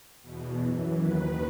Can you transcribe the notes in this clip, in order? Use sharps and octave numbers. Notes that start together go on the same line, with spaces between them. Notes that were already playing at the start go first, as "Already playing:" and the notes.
E2 B2
F#2 E3
D#2 D#3 B4